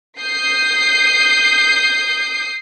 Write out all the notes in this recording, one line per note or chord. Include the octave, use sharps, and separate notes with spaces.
D#6 G6 C7